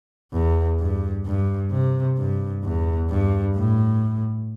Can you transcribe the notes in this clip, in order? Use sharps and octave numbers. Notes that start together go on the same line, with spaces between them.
E2
G2
G2
C3
G2
E2
G2
A2